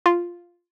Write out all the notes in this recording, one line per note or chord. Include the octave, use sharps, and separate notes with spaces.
F4